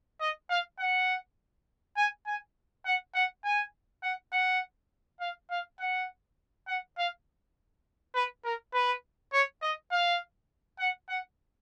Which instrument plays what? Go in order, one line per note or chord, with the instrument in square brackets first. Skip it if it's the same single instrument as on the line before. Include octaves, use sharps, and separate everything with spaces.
[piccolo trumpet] D#5
F5
F#5
G#5
G#5
F#5
F#5
G#5
F#5
F#5
F5
F5
F#5
F#5
F5
B4
A#4
B4
C#5
D#5
F5
F#5
F#5